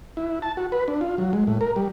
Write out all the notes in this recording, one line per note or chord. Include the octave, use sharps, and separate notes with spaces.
E4
A5
F#4
B4
D4
F4
F#3
G#3
A2
A#4
G3